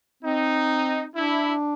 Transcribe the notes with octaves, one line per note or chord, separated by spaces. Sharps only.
C4 D#4
D4 E4